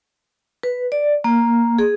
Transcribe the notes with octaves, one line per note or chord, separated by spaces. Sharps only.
B4
D5
A#3
G#4